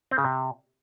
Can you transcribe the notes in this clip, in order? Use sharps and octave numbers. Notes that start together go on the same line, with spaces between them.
C4
C#3
C3